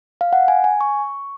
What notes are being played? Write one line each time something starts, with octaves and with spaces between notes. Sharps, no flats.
F5
F#5
G#5
G#5
C#6